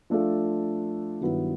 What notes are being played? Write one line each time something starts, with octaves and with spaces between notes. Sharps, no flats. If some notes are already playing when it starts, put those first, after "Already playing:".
F3 A3 D4 F4 A4
G2 D#3 F#3 B3 E4